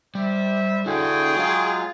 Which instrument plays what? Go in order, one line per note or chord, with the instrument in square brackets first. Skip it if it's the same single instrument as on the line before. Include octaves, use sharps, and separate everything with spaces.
[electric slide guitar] G3 [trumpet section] C5 E5
[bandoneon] D3 [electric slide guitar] E4 F#4 [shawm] G#4 [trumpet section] C#5 G5
[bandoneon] F#3 G#3 [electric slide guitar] F4 F5